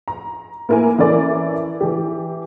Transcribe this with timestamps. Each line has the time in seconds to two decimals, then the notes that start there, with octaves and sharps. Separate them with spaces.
0.08 A#5
0.69 A#3 E4 A#4 B4 G#5
0.98 E3 C#4 E4 A4 A#4 D5
1.81 E3 G4